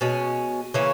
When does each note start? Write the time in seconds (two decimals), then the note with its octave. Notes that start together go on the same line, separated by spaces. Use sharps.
0.01 B2 G#3 C#4
0.74 C#3 E3 A#3 C#4